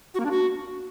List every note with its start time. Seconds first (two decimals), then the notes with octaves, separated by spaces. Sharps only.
0.14 F#4
0.20 A#3
0.25 D4
0.31 F#4